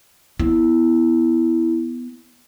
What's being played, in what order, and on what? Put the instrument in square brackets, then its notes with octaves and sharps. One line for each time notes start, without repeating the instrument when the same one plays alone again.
[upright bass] B3 [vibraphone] E4